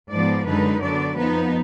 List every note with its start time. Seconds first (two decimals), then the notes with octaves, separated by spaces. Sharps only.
0.11 G#2 F3 B3 D5
0.46 F#2 D3 G#3 D#4 B4
0.82 D3 F#3 B3 D5
1.16 F2 F3 B3 D#4 B4